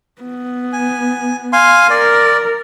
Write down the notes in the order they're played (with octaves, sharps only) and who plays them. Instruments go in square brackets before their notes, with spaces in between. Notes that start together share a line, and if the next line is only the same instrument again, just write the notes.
[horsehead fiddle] B3
[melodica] G#5
F5 G#5 C6
[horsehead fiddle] A#4 [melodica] D5